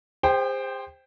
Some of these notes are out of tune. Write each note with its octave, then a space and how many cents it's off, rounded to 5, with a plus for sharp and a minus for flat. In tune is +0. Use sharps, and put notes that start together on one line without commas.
G#4 -45 C5 +0 G5 +0